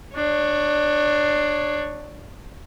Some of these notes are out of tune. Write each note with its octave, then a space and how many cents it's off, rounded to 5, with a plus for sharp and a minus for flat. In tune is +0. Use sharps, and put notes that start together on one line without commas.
D4 +15 C#5 -5